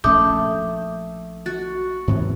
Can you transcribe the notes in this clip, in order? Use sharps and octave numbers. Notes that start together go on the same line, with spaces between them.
A#1 A3 C#4 D6 D#6 G6
F#4 A6
G#2 C3 E3